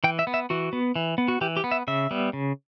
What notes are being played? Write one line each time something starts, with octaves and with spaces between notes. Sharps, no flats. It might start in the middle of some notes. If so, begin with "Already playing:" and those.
E3 G5
E5
B3
E5
E3 F#4
B3
E3
B3
F#4
E3 G4
G4
B3
E5
C#3 E5
G3 B3
C#3